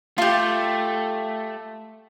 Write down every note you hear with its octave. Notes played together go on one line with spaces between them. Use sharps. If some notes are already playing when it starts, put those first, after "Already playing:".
A3 F4 G4